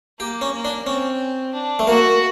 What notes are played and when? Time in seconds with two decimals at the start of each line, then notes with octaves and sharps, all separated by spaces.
0.19 A#3 G4
0.41 C#4
0.54 A#3
0.65 D4
0.86 C4 C#4
1.54 D4
1.79 A3
1.87 A#3 F#4